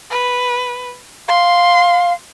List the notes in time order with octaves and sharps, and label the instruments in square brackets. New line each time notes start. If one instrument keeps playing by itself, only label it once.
[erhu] B4
[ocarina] F5 [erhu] C6